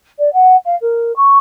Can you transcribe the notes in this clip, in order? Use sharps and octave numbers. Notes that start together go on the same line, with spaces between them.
D5
F#5
F5
A#4
C#6